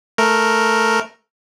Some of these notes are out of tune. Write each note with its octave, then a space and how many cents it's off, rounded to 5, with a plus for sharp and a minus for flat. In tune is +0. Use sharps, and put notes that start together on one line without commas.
A3 +0 A#4 +0